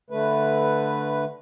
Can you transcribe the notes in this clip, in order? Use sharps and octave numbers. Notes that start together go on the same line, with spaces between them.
D3 A3 B4